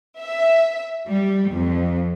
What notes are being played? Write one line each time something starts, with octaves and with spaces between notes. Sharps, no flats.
E5
G3
F2